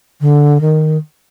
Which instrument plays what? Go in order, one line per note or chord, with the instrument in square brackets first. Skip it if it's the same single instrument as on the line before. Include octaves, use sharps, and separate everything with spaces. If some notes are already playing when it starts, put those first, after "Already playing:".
[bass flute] D3
D#3